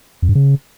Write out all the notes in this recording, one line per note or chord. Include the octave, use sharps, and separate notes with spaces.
F2
G2
C#3